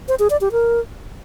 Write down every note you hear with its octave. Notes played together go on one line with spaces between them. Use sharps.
C5
G#4
D5
G4
A#4